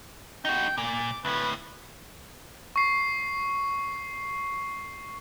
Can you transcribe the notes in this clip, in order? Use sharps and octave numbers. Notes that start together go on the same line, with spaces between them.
D#4 F#4 G5
A#2 D6
D2 A2 B4
C#6 C7